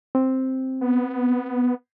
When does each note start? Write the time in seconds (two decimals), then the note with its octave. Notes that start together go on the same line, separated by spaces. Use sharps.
0.15 C4
0.81 B3